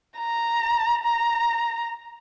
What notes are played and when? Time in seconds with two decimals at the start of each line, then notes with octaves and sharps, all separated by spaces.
0.17 A#5
1.04 A#5